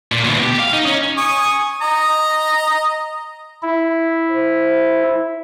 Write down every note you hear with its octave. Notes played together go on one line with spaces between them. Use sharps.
A#2
D2 B2
G4
F5
D#4
C#4
G#5 C#6 D#6
D#5 A#5
E4
C5